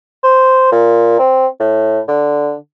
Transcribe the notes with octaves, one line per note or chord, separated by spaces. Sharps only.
C5
A#2
C4
A2
D3